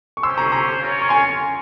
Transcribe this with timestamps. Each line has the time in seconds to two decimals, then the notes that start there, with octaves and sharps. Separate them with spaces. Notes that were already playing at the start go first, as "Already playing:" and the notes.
0.17 C#6
0.23 C#4 G4 C5 C6 E6
0.38 A#5 C#6
0.52 A#5 C#6
0.81 C#4 F4 A#4 C#5
1.02 C#6
1.09 G#5 C6